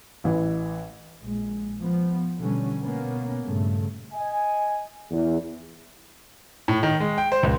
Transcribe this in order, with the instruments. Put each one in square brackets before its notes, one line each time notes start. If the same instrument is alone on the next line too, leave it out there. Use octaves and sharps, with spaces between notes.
[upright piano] A1 E3
[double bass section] A#1 G#3
F3 B3
B2 D3 E3 G3 C#4
B2 A#3 B3 C#4
G2 A#2 C#3 A3
[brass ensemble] D#5 G#5
E2
[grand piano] A2
D#3
G#3
G5
C5
C#2